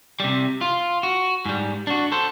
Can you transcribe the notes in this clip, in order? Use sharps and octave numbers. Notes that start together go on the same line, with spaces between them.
C3 G3
F4
F#4
G#2 G3
D4 F#4
A4 C5